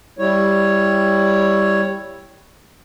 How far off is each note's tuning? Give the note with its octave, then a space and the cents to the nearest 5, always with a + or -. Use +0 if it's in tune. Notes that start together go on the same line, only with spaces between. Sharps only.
G3 +5 E4 +0 C#5 +0